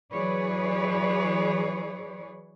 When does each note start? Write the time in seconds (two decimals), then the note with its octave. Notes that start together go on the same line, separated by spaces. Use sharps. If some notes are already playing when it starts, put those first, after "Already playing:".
0.13 E3 F#3 G#4 B4 C#5 D5